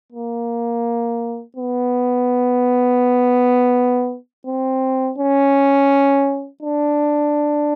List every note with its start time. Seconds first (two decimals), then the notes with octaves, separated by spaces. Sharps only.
0.12 A#3
1.57 B3
4.46 C4
5.18 C#4
6.63 D4